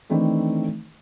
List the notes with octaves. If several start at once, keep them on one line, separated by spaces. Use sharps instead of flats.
D#3 E3 A3 C4 D4